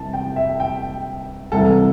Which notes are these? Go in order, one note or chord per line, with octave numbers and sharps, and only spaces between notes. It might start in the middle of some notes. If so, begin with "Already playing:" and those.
Already playing: C2 C3 E3 A5
G5
E5
G5
C2 C3 E3 A4